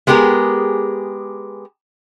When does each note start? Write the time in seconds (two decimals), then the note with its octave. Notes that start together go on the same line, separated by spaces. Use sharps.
0.07 G#3 B3 G4 G#4 A#4